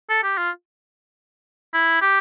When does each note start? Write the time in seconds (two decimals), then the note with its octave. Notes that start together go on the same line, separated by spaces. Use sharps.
0.10 A4
0.23 G4
0.38 F4
1.74 E4
2.02 G4